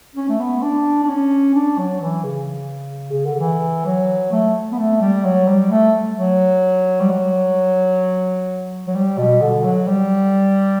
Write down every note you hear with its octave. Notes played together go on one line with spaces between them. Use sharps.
C#4
A3
B3
D4
D4
C#4
D4
F#3
E3
C#3
C#3
D3
E3
F#3
A3
B3
A3
G3
F#3
G3
A3
F#3
G3
F#3
F#3
G3
B2
D3
F#3
G3